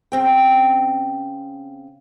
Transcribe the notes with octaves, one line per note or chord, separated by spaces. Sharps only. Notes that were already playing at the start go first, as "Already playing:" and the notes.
C#3 C4 G5